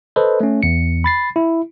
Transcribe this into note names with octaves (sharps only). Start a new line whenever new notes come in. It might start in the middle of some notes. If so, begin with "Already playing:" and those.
A4 B4 C5 D#5
A3 C#4
E2 C#7
B5 A6 C7
E4